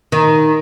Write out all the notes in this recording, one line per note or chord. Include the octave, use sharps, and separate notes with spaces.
D#3